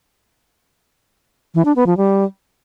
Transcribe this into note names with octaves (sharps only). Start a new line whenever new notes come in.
E3
D4
B3
F3
G3